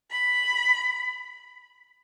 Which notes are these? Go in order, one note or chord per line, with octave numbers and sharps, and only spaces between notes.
B5